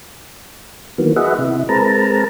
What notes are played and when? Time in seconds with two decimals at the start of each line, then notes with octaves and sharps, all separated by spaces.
0.98 D#3 E3 F#3 A#3 B3
1.16 F#4 G#4 B4 D#5 E5 F#5
1.39 C3 E4
1.69 G#3 C4 A#4 B4 A5 A#5